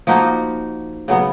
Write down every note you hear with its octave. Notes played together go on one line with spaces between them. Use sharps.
F3 A#3 D#4 F#4
C#3 F#3 B3